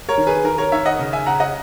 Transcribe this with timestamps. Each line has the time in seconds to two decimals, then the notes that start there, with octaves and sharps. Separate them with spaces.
0.09 A#4 C#5
0.18 D#3
0.27 G#4 B4
0.44 D#3 A#4
0.58 A#4 C#5
0.72 D#3 C#5 E5
0.85 D#5 F#5
0.99 C#3
1.13 E5 G#5
1.26 C#3 F#5 A#5
1.40 D#5 F#5